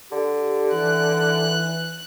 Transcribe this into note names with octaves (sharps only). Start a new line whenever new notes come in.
D3 G4
E3 F#6